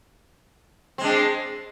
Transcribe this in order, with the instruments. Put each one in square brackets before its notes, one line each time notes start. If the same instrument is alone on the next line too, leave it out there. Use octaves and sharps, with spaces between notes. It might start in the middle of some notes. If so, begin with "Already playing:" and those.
[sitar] C4
G#3
D4